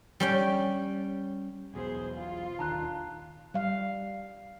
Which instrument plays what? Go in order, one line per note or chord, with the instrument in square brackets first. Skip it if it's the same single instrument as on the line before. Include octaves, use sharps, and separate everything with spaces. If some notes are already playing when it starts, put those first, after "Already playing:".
[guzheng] G3 C#4 G5
[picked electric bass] B1 E2 B2 [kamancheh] G#4 C5
[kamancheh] F4
[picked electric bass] D#1 D3 D#3 [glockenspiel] A5 A#5 F#6
[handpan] G3 F5